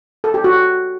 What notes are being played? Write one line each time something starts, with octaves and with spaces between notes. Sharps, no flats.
A4
G4
F#4